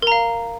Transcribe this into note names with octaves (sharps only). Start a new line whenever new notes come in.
A#4 F5 A#5